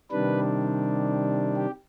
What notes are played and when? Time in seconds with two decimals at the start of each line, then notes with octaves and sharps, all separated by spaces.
0.11 C3 D#3 G3 D4 B4
1.56 G4